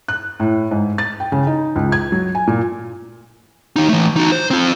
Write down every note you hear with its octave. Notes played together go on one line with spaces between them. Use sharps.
F#6
A2
G#2
A6
G5
C#3
D#4
C#2
G#6
F#3
G#5
A#2
D#2 D#4
E3 A3
D#4 F#4
C5
C4 F4